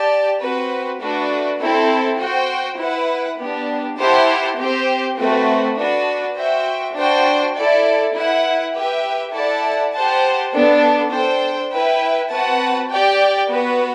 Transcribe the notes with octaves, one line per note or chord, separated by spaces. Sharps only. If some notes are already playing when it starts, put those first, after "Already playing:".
Already playing: G4 D5 A5
C4 F#4 B4
A3 D4 F#4 B4
C4 E4 A4
F#4 C5 G5
E4 B4 F#5
B3 D4 G4
E4 G4 C5 F#5 A5
C4 G4 C5
A3 C4 F#4 B4
D4 F#4 B4
F#4 C5 E5 G5
D4 F#4 C5 G5
E4 A4 D5
E4 B4 F#5
G4 B4 E5 G5
E4 A4 D5 F#5 A5
G4 C5 F#5 A5
B3 D4 A4
D4 A4 C5 G5
E4 B4 E5 G5
C4 F#4 B4 F#5 A5
G4 D5 G5
B3 F#4 B4